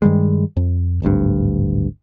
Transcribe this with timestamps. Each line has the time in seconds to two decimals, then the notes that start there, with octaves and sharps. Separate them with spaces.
0.02 G2 D#3 G3 G#3
0.57 F2
1.02 D1 G#1 D2 G2